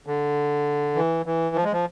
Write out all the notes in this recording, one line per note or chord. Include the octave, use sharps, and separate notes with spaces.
D3
E3
E3
F3
G#3
F3